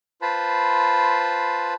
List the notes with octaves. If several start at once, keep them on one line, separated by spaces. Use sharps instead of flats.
F4 B4 C5 A5 B5